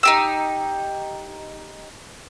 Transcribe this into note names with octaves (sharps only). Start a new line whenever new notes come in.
D#4 G4 E6